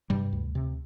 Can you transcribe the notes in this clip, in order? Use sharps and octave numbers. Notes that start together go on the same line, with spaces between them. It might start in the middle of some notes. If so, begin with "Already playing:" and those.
G2 C3 G3
D2
C3